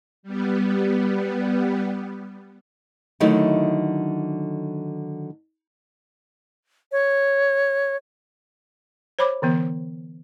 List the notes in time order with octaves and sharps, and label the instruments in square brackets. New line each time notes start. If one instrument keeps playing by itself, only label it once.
[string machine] G3 B3
[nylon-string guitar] D3 D#3 F#3 A3 D#4 E4
[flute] C#5
[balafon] C5 C#5 B5 D6
D3 E3 B3